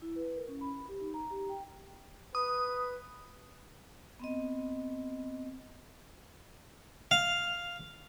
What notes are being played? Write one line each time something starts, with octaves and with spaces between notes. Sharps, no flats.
E4
B4
A#4
C#4
B5
G4
D#4
A#5
G4
G5
B4 D#6
B3 C4 D#5
F5